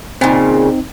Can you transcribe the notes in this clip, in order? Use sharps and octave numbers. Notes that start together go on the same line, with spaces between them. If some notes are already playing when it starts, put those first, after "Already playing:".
A#2 C#3 C4 D#4